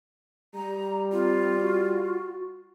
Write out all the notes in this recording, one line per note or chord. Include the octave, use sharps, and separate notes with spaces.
G3 A#5
C4 F4
F#4